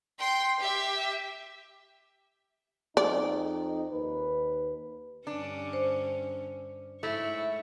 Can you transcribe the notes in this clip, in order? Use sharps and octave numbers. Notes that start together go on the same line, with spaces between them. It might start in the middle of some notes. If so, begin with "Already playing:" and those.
G5 C6
G4 E5
F2 C4 D#4 D5
D#2 B4
G2 D3 C#4 D4
C5
G#2 A3 E4 C#5